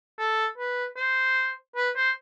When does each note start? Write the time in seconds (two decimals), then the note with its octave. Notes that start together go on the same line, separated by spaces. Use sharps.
0.18 A4
0.58 B4
0.97 C5
1.76 B4
1.96 C5